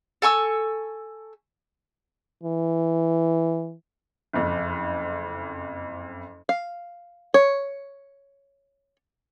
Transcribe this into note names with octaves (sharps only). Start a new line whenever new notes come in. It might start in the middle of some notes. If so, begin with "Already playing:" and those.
A4 G#5 C#6 E6
E3
F#1 F2
F5
C#5